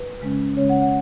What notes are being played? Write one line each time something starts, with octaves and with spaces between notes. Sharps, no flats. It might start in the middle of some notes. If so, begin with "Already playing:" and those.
Already playing: B4
C#3 G#3 C#4
C#3 G#3 C#4 C#5
F#5
F#5